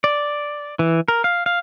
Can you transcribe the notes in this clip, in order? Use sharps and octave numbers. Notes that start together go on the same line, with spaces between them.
D5
E3
A#4
F5
F5